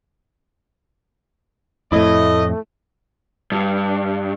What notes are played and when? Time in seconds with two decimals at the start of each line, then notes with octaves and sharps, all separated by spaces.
1.92 F2 A2 A3 E4 D#5
3.52 G2